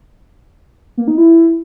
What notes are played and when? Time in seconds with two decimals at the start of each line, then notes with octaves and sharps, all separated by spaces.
0.98 A#3
1.08 D#4
1.18 E4